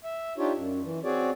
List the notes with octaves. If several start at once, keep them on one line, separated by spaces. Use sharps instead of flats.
E5
D4 D#4 F4 G4 C#5
F#2
E3
C4 F#4 G#4 C#5 D5